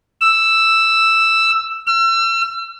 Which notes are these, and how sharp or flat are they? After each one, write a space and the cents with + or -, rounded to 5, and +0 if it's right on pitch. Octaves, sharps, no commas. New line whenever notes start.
E6 +5
E6 +40